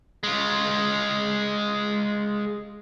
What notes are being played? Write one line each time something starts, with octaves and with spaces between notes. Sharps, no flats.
G#3 F4